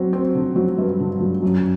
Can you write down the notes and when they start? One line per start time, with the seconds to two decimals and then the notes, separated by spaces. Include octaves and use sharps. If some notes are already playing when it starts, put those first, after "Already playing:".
Already playing: F#3 C4
0.13 C4
0.35 D3
0.56 F#3
0.78 G2
1.00 D3
1.20 F#3
1.42 F#2